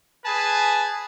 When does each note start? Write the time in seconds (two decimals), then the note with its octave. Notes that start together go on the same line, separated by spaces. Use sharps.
0.25 G#4 B4 G#5 A5